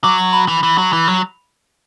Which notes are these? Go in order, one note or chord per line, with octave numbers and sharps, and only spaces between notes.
F#3 D6
C#6
B5
E3
E3
F#3
E3
F#3